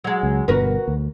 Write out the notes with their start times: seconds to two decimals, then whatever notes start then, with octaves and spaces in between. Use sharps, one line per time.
0.04 F#3 G#3
0.23 C#2
0.48 G1 G2 B2 F#4 A#4 B4
0.88 D2